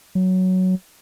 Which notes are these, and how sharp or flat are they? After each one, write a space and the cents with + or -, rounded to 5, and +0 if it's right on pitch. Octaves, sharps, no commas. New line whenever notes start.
F#3 +5